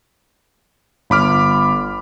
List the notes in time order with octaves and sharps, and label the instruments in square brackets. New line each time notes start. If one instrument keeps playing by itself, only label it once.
[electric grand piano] G1 B5 D6 F6